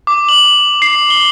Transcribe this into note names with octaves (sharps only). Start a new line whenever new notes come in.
D6
F#7
C7
G7